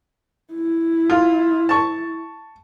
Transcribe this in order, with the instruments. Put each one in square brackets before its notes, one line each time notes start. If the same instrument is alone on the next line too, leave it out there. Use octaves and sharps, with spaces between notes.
[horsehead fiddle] E4
[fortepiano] F4
A5 C#6